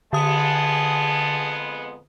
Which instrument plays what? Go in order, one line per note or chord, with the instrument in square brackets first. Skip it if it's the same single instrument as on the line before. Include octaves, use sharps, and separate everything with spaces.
[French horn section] F2 G#3 B3 [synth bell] D3 D#6 [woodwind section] G#4 G#5 A5